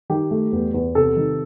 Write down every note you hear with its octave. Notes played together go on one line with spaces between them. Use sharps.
D#3 G4
A3
E2
E2
C3 A4
D#3